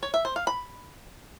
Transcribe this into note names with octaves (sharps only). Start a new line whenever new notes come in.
C#5
E5
C5
F5
B5